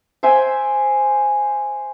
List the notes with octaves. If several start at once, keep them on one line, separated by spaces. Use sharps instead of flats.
C5 E5 G5 G#5